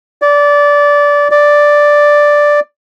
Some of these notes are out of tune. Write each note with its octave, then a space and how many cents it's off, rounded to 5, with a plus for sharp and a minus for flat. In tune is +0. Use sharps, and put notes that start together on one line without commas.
D5 -20
D5 +0